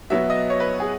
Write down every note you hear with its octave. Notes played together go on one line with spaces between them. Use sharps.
B2 F#3 B3 E5
D#5
C#5
B4
G#4